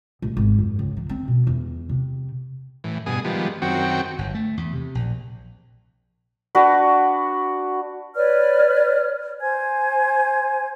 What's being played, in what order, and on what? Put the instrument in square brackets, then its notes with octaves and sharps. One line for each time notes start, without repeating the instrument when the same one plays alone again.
[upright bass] A1
G#1
F#2
C#2
E3
C4
B2
E2
C3
[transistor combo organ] A2 E3
G2 B2 G#4 D#6
D#3 F3 G3 G#3 B3
F#2 D#3 C4 F#4 G5 C#6
[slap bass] G1
A3
E2
C3
A#1
[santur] D4 F#4 B4
[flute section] B4 C#5 D5 F6
C5 G#5 G#6